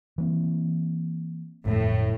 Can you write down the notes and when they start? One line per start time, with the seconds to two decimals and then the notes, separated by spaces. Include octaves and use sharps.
0.18 E3 A#3 C4
1.66 G1 F2 A2